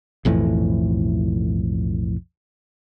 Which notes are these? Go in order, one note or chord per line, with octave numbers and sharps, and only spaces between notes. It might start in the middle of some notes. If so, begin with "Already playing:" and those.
B1 F2 A2 E3